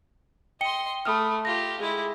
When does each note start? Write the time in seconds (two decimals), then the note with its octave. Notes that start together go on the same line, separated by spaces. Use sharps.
0.61 D#5 G5 C6 C#7 G7
1.05 A3 B5 D#6 F6
1.45 F4 G4 A#6
1.80 G#3 E4 G#4